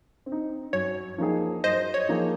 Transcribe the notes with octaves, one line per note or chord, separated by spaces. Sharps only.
C4
D#4
F#2 C#5
F3 A#3 D#4 G#4
F#2 C5 D#5
C#5
F3 A#3 D#4 G#4